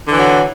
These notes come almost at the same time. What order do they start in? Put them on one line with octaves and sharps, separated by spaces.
D3 E3 F#3